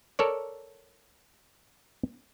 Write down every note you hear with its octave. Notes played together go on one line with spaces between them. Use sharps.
A4 A#4 C#5 D5